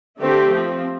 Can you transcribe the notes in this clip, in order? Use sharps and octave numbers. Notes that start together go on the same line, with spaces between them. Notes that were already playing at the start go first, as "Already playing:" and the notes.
D3 A3 C4 G4
F3 C4